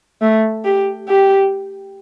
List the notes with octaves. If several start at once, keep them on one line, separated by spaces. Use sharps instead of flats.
A3
G4
G4